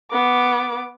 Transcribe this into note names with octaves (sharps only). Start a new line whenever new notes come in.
B3 D6